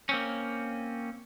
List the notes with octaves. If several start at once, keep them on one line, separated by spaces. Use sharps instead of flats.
A#3 C4 C#4